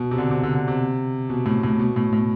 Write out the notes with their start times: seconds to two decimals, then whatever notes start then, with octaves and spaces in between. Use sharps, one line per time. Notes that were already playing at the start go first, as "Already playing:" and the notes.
Already playing: B2
0.11 C3
0.18 D3
0.31 C3
0.43 D3
0.55 D3
0.68 C3
1.29 B2
1.46 A2
1.63 A2
1.79 B2
1.96 A2
2.13 A2